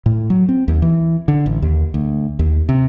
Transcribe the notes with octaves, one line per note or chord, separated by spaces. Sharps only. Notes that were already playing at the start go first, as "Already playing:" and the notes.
A2
F#3
C4
D#2
E3
D3
A1
D#2
D2
D#2
C3